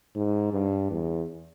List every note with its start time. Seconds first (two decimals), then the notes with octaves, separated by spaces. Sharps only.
0.15 G#2
0.53 G2
0.91 E2